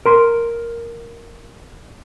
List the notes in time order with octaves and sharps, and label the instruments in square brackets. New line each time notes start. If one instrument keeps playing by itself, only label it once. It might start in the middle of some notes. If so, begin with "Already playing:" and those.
[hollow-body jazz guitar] A#4 C6